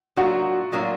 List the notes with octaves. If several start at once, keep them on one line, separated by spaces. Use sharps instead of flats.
A2 F#3 A#3 D4 F4 F#4
A2 F#3 A#3 D4 F4